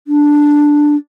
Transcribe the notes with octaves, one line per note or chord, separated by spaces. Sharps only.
D4